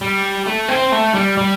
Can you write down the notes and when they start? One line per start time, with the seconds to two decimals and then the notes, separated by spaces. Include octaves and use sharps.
0.01 G3
0.46 A3
0.69 C4
0.92 A3
1.14 G3
1.37 G3